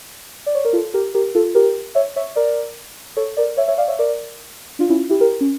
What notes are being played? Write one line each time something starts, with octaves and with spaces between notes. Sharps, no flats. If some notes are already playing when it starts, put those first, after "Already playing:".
D5
C#5
A#4
F4 A4
G4 A#4
G4 A#4
F4 A4
G4 A#4
C#5 E5
C#5 E5
A#4 D5
A4 C#5
A#4 D5
C#5 E5
C#5 E5
D5 F5
C#5 E5
A#4 D5
D4 F4
C#4 E4
E4 G4
G4 A#4
C#4